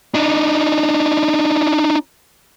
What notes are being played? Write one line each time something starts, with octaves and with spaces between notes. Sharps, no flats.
D4 D#4